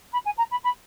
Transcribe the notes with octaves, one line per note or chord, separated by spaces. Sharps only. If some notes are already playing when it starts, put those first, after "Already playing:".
B5
G#5
A#5
B5
B5